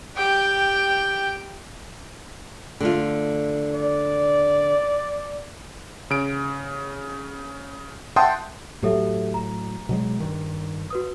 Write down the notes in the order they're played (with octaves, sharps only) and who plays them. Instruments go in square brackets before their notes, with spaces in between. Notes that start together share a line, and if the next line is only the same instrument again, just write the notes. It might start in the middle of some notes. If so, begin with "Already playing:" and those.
[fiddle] G4 G5
[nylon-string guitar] D3 A3 F4
[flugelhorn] D5
[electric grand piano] C#3 D7
E5 F#5 G5 A5 C6 D#6
[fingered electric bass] A2 F#3 [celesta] G4 A4 E5
[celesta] A#5
[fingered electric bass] B2 F#3 G#3
G2 D#3
[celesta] F#4 B4 D#6